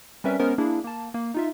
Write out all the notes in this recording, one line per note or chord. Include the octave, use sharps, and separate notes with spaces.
G3 C4 C#4 A#4 B4 E5
G#3 B3 C#4 A#4 C5
A#3 D4 E4 G#4
A#3 A5
A#3
D#4 F4 E5